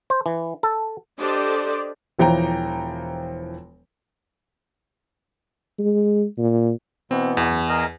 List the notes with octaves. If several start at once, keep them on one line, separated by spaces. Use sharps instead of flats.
C5
E3
A4
D4 G4 A4 C5 D5 D#5
E1 E3 F3 G5 A#5
G#3
A#2
B2 E3 B3 C4
E2
F#2
G#4 A#4 D#5